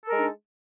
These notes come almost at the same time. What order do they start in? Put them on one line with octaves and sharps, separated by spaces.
A4 A#4 G#3 D#4 D4